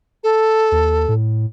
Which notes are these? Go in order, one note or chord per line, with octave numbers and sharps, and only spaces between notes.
A4
D#2
A2